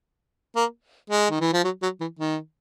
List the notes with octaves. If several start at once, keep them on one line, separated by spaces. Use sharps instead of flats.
A#3
G#3
D#3
E3
F3
F#3
F#3
E3
D#3